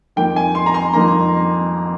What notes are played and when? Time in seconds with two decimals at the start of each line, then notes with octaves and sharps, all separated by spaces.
0.16 F2 D#3 A#3 G5
0.36 G#5
0.55 C6
0.66 A#5
0.74 C6
0.93 F2 D#3 A#3 A#5